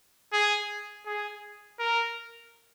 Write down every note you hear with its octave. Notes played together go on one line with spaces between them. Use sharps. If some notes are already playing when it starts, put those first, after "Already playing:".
G#4
G#4
A#4